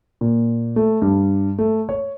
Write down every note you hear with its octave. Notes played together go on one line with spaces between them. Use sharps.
A#2
A3
G2
A3
C#5